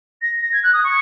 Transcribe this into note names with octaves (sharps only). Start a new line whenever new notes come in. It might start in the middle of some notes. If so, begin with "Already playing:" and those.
A#6
A#6
G#6
F#6
D#6
C#6